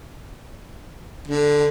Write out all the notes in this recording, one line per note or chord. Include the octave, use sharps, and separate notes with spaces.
D3